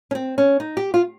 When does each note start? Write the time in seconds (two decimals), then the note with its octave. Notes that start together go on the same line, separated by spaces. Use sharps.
0.11 C#4
0.15 C4
0.38 C#4
0.60 D#4
0.77 G4
0.94 F4